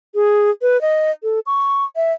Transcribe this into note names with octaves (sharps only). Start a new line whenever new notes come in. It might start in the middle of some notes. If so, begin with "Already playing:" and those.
G#4
B4
D#5
A4
C#6
E5